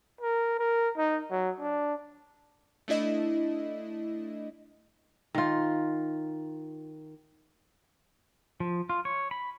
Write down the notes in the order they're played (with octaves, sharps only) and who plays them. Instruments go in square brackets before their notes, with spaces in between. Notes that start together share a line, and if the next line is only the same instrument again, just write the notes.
[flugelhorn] A#4
A#4
D#4
F#3
D4
[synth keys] A3 D4 E4 D#5
[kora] D#3 F4
[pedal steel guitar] F3
F4
C#5
B5